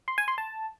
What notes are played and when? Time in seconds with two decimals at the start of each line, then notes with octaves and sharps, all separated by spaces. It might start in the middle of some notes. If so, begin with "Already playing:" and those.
0.08 C6
0.18 G#5
0.28 C6
0.38 A5